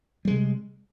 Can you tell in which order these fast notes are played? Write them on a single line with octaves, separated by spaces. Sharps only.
G3 G#3 C3